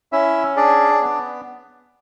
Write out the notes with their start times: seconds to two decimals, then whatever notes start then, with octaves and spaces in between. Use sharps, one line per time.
0.12 C#4 E4 E5
0.56 D4 G#4 D5
1.01 B3